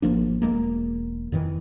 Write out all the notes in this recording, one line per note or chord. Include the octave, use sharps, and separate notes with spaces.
G#1 F3 A#3 D4
E1 E2 G#3 A#3
F2 A#2 D#3 E3